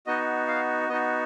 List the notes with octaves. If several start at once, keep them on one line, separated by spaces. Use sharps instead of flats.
B3 D#4 F#4 D#5
F5
B3 D#4 F#4 D#5